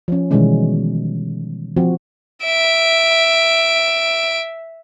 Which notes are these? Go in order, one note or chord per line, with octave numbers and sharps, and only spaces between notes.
F3 C#4
B2 D#3 E3 G3 G#3 C#4
F3 C4 F#4
E5 D7